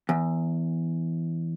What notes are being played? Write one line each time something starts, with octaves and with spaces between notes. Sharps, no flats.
E2